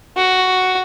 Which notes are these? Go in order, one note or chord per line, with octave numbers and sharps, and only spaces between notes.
F#4